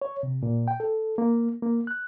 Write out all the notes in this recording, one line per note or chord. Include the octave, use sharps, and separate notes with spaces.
C#5
C3
A#2
G5
A4
A#3
A#3
F#6